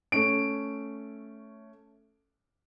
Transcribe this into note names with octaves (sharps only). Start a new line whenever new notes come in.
A3 C#4 D7